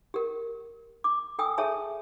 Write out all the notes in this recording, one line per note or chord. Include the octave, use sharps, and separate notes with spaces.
G4 A#4
D6
A4 G5 G#5 D#6 E6
G#4 A4 C#5 E5 G#5 A5